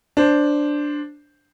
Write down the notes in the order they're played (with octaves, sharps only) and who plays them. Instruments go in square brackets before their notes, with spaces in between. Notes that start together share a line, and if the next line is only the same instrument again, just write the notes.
[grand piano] D4 C5